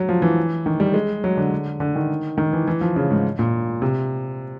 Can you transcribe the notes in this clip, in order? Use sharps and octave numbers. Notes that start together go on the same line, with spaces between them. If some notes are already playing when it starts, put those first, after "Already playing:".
Already playing: F#3
F3
E3
D#3
G3
G#3
F#3
D3
D3
D#3
D#3
E3
E3
F3
C#3
G#2
A#2
C3